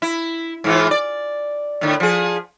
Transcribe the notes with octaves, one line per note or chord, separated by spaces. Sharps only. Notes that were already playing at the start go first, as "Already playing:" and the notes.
E4
G#2 E3 F4
D5
A2 D3
F3 G#4